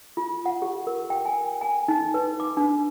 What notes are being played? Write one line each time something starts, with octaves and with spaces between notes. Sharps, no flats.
F4
F#5
G4
A#4
G5
G#5
G#5
D#4
B4
D6
D4